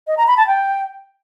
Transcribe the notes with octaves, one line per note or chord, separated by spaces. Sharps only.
D#5
A#5
B5
A5
G5